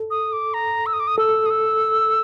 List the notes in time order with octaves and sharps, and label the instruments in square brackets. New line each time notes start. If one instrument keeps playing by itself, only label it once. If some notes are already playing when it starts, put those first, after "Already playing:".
Already playing: [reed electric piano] A4
[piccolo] D#6
D6
A#5
E6
D#6
D6
D#6
[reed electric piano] A4 [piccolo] E6
[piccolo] D#6
E6